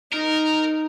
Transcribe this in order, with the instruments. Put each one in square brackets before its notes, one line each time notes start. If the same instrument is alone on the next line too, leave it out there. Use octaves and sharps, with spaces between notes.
[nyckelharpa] D#4 [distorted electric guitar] A#4